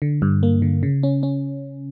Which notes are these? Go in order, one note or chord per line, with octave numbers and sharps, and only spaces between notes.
D3
G2
A#3
D3
C#3
C#4
C#4